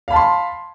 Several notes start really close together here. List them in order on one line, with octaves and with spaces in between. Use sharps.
F5 B5 A5 C6